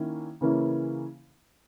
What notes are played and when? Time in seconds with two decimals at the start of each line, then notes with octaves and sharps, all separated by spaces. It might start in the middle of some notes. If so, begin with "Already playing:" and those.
Already playing: D#3 A#3 C#4 E4
0.41 C#3 E3 A#3 C#4 E4